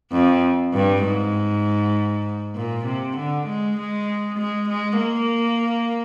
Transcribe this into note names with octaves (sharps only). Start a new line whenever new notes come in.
F2
G2
G#2
A#2
C3
D3
G#3
G#3
G#3
G#3
A#3